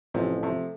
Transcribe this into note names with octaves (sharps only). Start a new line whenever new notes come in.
A1 C3 F3
C3 F3 A3